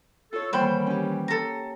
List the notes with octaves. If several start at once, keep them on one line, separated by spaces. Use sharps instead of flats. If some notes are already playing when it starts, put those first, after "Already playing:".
F4 A4 C#5
D#3 E3 G3 A#3 C5 F#5 G5 B5
C#4 G4
A4 A#5